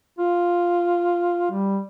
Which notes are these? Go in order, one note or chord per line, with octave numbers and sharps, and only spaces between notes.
F4
G3